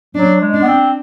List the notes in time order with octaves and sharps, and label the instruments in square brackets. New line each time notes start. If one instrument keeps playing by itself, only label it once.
[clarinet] F#3 [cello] D4
[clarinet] G#3
[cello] D4
[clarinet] B3
C4